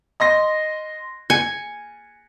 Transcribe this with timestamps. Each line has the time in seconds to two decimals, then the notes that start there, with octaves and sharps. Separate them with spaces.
0.20 D#5 C6 A#6
1.30 G#5 C#7